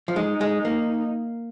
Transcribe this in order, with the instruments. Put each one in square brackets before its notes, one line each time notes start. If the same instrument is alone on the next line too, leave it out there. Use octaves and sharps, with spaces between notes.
[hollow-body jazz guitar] F3
[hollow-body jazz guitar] G#3 [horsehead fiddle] D#4
[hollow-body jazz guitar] G#3
A#3